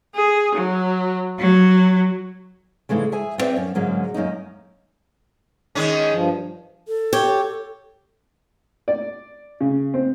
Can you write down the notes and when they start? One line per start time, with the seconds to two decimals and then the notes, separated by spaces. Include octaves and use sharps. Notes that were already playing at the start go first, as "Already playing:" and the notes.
0.14 G#4
0.54 F#3
1.38 F#3
2.89 G#2 C#3 E3 G#3 A3
3.12 G#4 E5 G#5
3.38 B3 C4 B4 D5 E5
3.56 F#2 C#4
3.75 G#2 D3 F#3 G#3 A#3 C#4
4.14 F#2 A#3 C#4 D#4
5.75 D#3 G#3 C#4
6.13 G2 F3
6.88 A4
7.13 G4 C#5
8.88 D5
9.61 C#3
9.94 C4